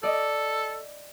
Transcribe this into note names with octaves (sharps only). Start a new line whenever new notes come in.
A4 D5 D#5